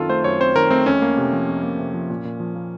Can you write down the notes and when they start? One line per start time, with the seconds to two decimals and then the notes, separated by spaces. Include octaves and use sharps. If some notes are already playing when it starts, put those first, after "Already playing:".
Already playing: F#2 D#3 C4 F4 A4
0.09 A3 C5
0.24 F#2 C#5
0.40 C4 C5
0.55 D#3 A#4
0.71 A3 C4
0.86 F2 C#4
1.02 A#3
1.17 C3
1.32 F3
1.49 F2
1.63 A#3
1.79 C3
1.94 F3
2.10 A#2
2.25 A#2
2.40 F3
2.55 A#3